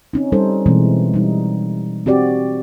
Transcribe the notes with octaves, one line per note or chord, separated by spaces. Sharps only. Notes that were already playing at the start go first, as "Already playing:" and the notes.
C4 C#4 D#4
G3 C#4 D#4 A4 C5
B2 E3 G#3 C4
G3 D#4
C4 F#4 G4 D5